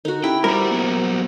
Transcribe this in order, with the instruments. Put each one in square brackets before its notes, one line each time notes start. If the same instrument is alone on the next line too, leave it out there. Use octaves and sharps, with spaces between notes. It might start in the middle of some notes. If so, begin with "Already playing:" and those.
[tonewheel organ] D3 A4 A#4 [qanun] D#4 F#4
[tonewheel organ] C#4 G4 [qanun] E4 [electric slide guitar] G5
[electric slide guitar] G3 G4 [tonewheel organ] F#4 C5 F#5 [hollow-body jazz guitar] A#4
[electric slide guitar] F#3 A#3 B3